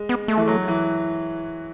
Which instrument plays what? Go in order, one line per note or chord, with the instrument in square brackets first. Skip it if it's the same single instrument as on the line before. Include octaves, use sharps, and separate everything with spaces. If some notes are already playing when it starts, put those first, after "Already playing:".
Already playing: [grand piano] G#3
[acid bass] B3
A3
[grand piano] E3
F#3
E3